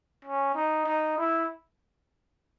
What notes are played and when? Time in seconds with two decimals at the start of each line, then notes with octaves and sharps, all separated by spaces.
0.25 C#4
0.55 D#4
0.86 D#4
1.18 E4